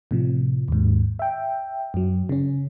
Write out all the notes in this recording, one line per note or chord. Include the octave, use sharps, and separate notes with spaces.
A2 C3 F3
D#2 G#2
E5 G5
F#2 F#3
C#3 C#4